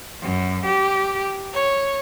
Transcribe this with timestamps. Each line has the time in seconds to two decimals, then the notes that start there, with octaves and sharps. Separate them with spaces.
0.21 F#2
0.65 G4
1.53 C#5